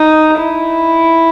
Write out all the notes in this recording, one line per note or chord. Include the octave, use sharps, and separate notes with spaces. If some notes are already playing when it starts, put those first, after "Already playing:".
Already playing: D#4
E4